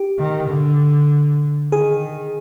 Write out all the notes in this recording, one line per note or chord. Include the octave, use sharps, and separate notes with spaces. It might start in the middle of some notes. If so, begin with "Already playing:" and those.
Already playing: G4
D#3
D3
D#3 G#4